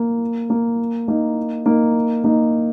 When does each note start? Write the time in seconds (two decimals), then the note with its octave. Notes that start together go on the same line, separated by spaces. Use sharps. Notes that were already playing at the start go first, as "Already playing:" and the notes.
Already playing: A#3
0.50 A#3
1.08 A#3 D#4
1.66 A#3 D#4
2.24 A#3 D#4